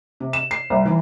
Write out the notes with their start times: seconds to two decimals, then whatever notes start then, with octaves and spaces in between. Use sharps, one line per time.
0.20 C3
0.33 E7
0.51 C7
0.70 C2
0.85 E3